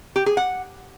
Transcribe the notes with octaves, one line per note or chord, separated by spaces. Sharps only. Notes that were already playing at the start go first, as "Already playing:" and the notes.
G4
G#4
F#5